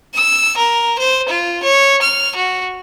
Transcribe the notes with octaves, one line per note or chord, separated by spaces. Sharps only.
E6
A#4
C5
F4
C#5
F6
F#4